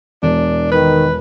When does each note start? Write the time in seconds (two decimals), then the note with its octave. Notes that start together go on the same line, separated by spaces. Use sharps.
0.23 E1 D4
0.72 D#3 B4